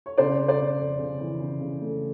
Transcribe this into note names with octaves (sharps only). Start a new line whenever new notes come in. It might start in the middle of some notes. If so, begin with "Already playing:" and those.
C#5
C#3 C5 D5
C#3
C5 D5
C#3
F2
C#3
E3
C#3
C#3
A3